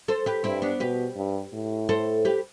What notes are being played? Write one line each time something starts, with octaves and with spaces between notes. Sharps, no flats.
A4 C5
G4 B4
G2 C4 E4
B3 D4
B2 G4 B4
G2
A2
A4 C5
G4 B4